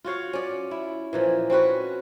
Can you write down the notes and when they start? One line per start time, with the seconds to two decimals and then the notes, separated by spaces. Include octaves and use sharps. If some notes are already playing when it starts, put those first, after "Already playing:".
0.04 F4 F#4 C#5 F5
0.33 C#4 D5
0.71 E4
1.13 A#2 E3 F3
1.50 C4 C#4 F#4 B4